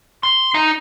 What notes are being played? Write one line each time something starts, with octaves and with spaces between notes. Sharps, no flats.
C6
D#4